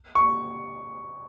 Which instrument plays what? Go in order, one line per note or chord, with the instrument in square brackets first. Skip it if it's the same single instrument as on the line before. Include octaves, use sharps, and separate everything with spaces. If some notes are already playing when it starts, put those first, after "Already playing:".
[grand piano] C#6